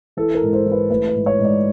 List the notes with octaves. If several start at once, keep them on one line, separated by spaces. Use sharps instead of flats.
E3 A4
A#4
G#2
C5
E3
B4
A3 B4
B4
G#2
C#5
G#2
D5